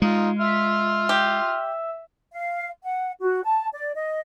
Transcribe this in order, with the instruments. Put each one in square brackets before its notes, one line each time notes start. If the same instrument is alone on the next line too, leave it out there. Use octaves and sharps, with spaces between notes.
[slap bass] G#3 [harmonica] D#4 F4
[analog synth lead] E5 [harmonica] C6 F6
[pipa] G4
[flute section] F5
F#5
F#4
A5
D5
D#5